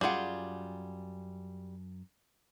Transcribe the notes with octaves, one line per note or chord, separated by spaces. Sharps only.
F#2 G3 F4 G#4 F#5